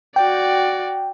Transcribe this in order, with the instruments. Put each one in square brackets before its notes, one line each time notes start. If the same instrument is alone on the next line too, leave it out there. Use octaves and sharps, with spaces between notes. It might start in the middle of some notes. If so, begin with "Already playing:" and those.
[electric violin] F#4 D5 [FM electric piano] G5